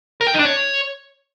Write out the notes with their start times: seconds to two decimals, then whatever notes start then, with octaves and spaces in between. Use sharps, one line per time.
0.21 A#4
0.27 G5
0.33 D#4
0.39 D4
0.45 C#5